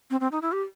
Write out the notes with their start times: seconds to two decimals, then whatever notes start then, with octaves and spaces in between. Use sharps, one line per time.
0.10 C4
0.21 C4
0.32 D#4
0.42 E4
0.52 G4